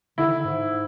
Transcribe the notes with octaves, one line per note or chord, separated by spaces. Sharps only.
D3 E4
D#3
D3
G#2